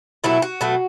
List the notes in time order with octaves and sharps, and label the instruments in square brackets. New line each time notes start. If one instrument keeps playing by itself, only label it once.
[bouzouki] B2 F#3 A3 E4
F#4
B2 F#3 A3